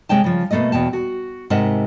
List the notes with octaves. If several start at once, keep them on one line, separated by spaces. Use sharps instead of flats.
C3 G#3 C#5 G5 A5
C#3 F3
B2 E3 A3 A#3 D#5
E2 B2 G5 A5
F#4
G#2 C3 A#4 D#5 F#5 A5